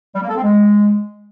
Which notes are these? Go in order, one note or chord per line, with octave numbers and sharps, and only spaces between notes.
G3
A#3
A4
C4
G#3